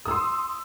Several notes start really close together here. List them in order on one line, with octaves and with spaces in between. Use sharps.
D#6 E6 C6